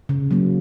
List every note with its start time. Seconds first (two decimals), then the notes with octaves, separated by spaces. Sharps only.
0.09 C#3
0.31 F#3 A#3